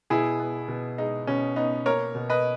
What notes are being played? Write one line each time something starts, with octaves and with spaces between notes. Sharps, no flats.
B2 E4 G#4
B3
B2
G#3 D#4
B2 C#4
B3 D#4
A#3 A#4 C#5
B2
B4 D#5